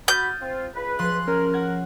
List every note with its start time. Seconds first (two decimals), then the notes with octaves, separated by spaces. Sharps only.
0.08 F#4 B5 D#6 F6 G6 A6
0.42 C4 F4
0.75 C#2 B4
0.99 F3 G#4 C6 F#6
1.28 C#4 A#4
1.54 F#5 G#6